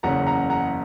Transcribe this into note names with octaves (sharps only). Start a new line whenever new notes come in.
F#1 E2 C#3 F#5 A#5
F#5 A#5
F#5 A#5